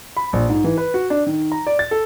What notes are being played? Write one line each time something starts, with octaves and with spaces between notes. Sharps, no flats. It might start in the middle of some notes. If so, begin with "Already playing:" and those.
B5
A#1
G#2
E3
B4
F#4
D4
D#3
A#5
D5
A6
A4